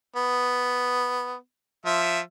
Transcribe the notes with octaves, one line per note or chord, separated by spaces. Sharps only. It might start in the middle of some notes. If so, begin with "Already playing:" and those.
B3
F3 E5